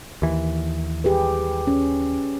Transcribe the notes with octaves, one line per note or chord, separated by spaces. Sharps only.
D#2 E3
G4 G#4 B4
C#4